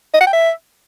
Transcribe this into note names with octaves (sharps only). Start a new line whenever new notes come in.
D#5
F#5
G5
E5